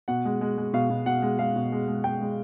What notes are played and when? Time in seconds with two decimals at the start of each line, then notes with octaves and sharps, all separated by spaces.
0.08 B2 F#5
0.25 G#3
0.41 G#3
0.58 G#3
0.74 B2 F5
0.90 B2
1.06 B2 F#5
1.22 G#3
1.39 G#3 F5
1.56 B2
1.72 G#3
1.88 G#3
2.04 G#3 G5
2.21 G#3